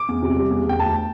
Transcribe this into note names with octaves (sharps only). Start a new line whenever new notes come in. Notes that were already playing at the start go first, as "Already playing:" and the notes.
Already playing: D6
E2
C3
G3
E2
E2
G5
D2 A5